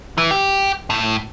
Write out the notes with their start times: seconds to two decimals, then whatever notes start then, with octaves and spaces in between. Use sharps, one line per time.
0.18 E3
0.31 G4
0.90 A2